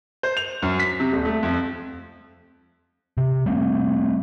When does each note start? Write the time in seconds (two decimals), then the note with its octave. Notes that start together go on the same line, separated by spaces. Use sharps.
0.23 C5
0.37 F7
0.62 F#2
0.79 B6
1.00 C3
1.12 D#1
1.25 A3
1.43 F2
3.17 C3
3.46 G3 A3 C4